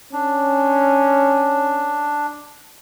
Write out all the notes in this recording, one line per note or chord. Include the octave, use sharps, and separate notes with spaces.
C#4 D4